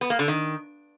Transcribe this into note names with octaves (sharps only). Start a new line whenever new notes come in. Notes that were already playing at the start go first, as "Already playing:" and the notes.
B3
A#3
D3
D#3